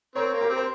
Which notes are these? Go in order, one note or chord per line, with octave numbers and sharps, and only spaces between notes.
C4 A#4 C#5
A#3
G4 A#4
C4
C5